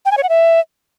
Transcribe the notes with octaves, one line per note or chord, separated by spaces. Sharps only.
G5
G#5
C#5
F#5
E5